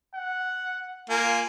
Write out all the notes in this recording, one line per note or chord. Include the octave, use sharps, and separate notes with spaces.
F#5
A#3 F4 G#5